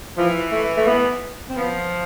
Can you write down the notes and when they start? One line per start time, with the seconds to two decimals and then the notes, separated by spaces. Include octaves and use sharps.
0.17 E3 F3
0.52 A3
0.77 A3
0.87 B3
1.49 C4
1.56 F3 B3